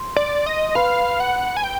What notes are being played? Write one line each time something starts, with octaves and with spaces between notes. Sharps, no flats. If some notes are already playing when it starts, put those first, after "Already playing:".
Already playing: C5
D5
D#5
B4 F5
F#5
G#5
G5